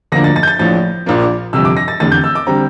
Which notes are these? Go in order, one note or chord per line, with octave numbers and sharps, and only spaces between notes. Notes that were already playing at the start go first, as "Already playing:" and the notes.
D2 D3 F3 A#3 D4 A#6
A6
A6
G6
A6
A#1 A2 F3 A6
A#1 A#2 F3 A#3 D4
G1 F2 C3 E6
D6
A#6
A6
F1 E2 D3 A6
G6
E6
D6
D3 G3 C4 A#5